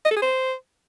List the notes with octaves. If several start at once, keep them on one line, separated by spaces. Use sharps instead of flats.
D#5
A4
G#4
C5